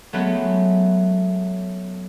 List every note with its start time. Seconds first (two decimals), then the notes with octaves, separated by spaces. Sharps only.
0.13 F#3 G#3 A3 B3 C#4